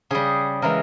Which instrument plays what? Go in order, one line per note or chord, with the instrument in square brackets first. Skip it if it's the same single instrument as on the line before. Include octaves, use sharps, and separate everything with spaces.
[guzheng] C#3 G3 G#4
C#3 E3 G#3 A#4